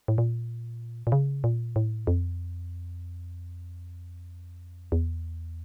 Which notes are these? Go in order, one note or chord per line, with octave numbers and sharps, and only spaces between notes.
A2
A#2
A#2
C#3
A#2
A2
F2
E2